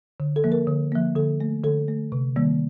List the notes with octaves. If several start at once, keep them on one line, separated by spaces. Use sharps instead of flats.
D3
A4
F3 A#3
A#4
D3
F3 A#3
D3 A4
A3
D3 A4
A3
C3
D#3 G3 A#3